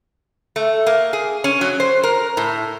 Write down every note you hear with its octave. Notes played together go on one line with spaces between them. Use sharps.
A3
A#3
G#4
C#4
F#3
C5
A#4
A2